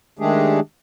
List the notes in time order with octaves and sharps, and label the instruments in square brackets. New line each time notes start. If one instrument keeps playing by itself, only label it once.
[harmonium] D#3 G#3 A3 D4 G4 G#4